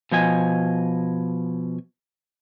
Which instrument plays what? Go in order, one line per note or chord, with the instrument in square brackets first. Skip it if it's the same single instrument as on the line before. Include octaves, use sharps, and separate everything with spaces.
[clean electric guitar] B2 F3 D#5 G#5